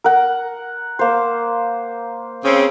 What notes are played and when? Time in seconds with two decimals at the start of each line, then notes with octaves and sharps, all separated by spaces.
0.04 A#4 F#5
0.99 A#3 C5
2.44 C#3 C4